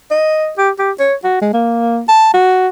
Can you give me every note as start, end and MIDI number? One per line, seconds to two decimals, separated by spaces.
0.11 0.51 75
0.58 0.71 67
0.79 0.91 67
0.99 1.14 73
1.24 1.40 66
1.41 1.50 56
1.53 2.02 58
2.08 2.29 81
2.34 2.68 66